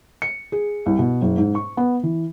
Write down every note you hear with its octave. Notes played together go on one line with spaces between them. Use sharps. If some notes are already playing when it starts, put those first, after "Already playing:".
C#7
G#4
C2
B2
F#1
G#2
C#6
B3
E3